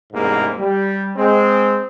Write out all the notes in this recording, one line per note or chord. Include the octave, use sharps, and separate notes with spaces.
A1 E2 G#2 C3 A#3
G3
G#3 C4